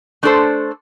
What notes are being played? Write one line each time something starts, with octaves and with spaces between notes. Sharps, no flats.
A3 D4 A4 C5